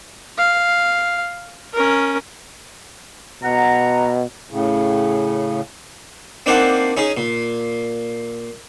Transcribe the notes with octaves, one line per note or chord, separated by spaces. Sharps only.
F5
C#4 A#4
B2 F#5 A#5
A2 C#3
A#3 C4 D4 D#4 C5 F#5
C#4 D#4 G#4
A#2